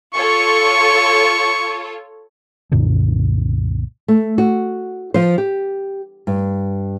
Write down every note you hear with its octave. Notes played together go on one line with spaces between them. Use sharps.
F4 A4 C#5 C#6
C2 F#2 A#2 D3
A3
F#4
F3 C5
G4
G2